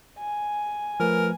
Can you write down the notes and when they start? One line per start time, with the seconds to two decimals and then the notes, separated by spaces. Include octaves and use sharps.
0.19 G#5
1.00 F3 A3 A#4 B4